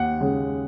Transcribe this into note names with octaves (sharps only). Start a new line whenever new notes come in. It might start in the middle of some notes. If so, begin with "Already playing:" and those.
Already playing: D#2 F#5
C#3 G#3